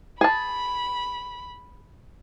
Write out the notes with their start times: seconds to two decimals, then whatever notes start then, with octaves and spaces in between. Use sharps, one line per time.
0.21 G#4 A5 B5